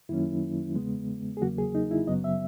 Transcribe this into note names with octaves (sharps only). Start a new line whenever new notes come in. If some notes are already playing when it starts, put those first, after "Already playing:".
F#2 D#3 F#3 A#3 C#4 E4
E2 C#3 G#3 B3
G#4
E2 C#3 F#3 A#3 F#4
G#4
D#4
E4
F#2 C#3 F#3 B3 D#5
E5